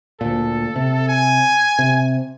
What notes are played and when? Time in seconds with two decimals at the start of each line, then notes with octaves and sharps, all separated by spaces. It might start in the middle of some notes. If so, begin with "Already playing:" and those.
0.21 D2 A#2 A4
0.76 C3
1.08 G#5
1.79 C3